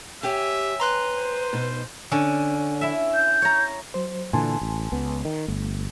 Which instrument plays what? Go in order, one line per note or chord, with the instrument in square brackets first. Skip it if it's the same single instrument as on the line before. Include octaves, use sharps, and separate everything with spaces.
[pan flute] G4 [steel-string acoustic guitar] C#5 G5 G#5 [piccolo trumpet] E5
[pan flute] B4 [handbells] A#5 C6 F#6
[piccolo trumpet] C5
[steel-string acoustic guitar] B2 D#4
[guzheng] D3 C#4
E4 E5
[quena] G6
[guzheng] C#5 A#5
[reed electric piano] F#3 C5
[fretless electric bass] A#2 D3 E3 [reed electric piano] G#5 A5 C6
[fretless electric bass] A1
C#2 B3
D#3
[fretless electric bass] G1 [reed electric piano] A3